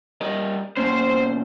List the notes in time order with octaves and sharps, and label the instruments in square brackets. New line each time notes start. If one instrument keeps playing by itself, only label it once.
[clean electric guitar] G3 A#4 D#5
[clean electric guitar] B1 A#3 C#4 [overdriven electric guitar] C5